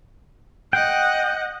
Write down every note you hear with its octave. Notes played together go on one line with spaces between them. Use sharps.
D#5 F#5 G5